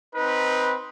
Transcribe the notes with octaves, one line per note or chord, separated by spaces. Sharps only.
C4 D#4 B4